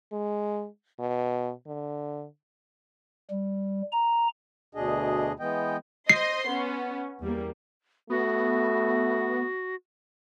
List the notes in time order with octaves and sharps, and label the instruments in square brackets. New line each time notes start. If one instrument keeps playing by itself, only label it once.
[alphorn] G#3
B2
D3
[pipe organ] G3
A#5
[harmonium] D2 B2 D4 G#4 D#5
E3 G#3 B3 D#5 G5
[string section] C5 D#5 C6 [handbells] C7
[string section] B3 C#4
E2 G3 A#3
[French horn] A3 [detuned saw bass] B3 [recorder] F#4